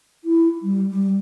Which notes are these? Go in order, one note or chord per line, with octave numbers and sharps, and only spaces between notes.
E4
G3
G3